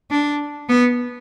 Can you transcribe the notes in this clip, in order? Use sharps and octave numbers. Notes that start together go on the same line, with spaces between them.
D4
B3